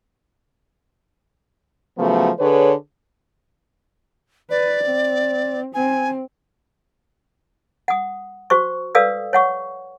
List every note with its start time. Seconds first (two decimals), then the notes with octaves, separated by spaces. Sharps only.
1.98 C#3 F3 F#3 A3 B3
2.39 D3 G#4 B4 C#5
4.50 B4 D5
4.84 C4
5.74 C4 G#5
7.88 F#5 D#6
8.50 F#4 C5 C#6
8.95 A4 B4 D5 F5 D#6 E6
9.33 C#5 F#5 C#6